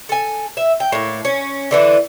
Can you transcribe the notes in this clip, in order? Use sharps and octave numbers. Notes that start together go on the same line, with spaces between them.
A4 G#5
E5
G5
A2 A#3
C#4
D3 E3 B3 E4